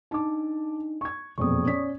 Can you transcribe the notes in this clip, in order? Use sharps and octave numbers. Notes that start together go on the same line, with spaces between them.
D4 D#4 A5 D6
C#6 G#6
E1 F2 A#2 C#6 D#6
C#4 D5 B6